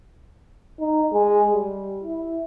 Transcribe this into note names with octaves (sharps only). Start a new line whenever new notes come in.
D#4
G#3
G3
E4